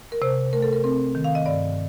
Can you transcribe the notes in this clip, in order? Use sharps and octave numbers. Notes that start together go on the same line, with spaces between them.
A#4
C3 C5
A3 A#4
A4
A#4
C4 A#4
D#3
F5
D#5
G2 D5